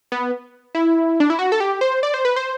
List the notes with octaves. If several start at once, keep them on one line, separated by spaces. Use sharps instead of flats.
B3
E4
D4
E4
F#4
A4
G4
C5
D5
C5
B4
C5